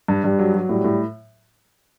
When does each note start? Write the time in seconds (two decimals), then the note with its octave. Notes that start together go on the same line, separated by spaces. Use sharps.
0.08 G2
0.24 G2 G3
0.39 F#3
0.54 F#3
0.69 A2 G3
0.84 A2